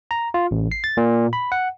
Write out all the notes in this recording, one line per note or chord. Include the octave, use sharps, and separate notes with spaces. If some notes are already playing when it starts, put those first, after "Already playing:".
A#5
F4
A1
C7
A6
A#2
B5
F#5